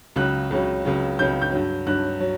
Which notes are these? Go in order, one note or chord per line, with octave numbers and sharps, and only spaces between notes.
C#2 C#3 F#3 F#6
C#2 C#3 F#3
C#2 C#3 F#3
C#2 C#3 F#3 G6
G6
G2 F#3
G2 F#3 F#6
F#3